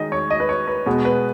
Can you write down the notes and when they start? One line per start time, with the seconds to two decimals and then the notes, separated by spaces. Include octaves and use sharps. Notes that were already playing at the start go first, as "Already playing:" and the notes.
Already playing: D#3 G#3 D#5
0.12 C#5
0.30 D#5
0.40 B4
0.49 C#5
0.67 B4
0.86 B2 G#3 B3
1.05 B4